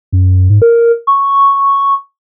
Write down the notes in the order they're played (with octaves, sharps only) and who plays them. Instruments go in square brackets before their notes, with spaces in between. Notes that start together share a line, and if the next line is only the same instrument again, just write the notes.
[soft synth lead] F#2
G#2
A#4
C#6